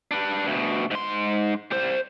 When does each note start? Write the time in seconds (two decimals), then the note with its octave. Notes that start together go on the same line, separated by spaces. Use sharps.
0.11 D4 B4
0.47 D2 B2
0.91 G#2 C6
1.71 G3 C5